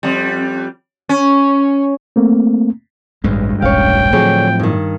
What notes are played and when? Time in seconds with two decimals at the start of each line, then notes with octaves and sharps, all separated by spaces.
0.03 F2 G3
1.09 C#4
2.16 A3 A#3 C4
3.24 A1 D2 G2 G#3
3.62 E1 A#1 C#4 C#5 F5 G5
4.13 A2 D3 F3 F#3 C4 G#4 C#5
4.60 G2 D#3